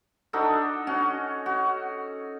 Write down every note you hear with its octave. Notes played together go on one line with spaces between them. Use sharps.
D4 D#4 F#4 A4
C#4 F#4
F#4